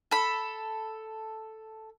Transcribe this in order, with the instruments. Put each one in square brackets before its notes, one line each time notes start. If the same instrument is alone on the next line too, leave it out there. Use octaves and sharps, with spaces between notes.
[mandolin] A4 B5